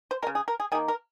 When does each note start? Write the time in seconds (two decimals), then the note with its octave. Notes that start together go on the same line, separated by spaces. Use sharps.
0.11 C5
0.22 G#3 A#4
0.27 C#3
0.35 G#4
0.48 A#4
0.60 G#4
0.72 D#3 G#4
0.75 A#3
0.88 A#4